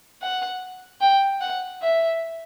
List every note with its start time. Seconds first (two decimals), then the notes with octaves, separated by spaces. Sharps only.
0.22 F#5
1.01 G5
1.41 F#5
1.82 E5